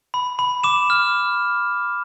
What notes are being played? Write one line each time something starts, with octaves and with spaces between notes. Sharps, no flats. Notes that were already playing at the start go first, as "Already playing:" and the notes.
B5
B5
D6 E7
F6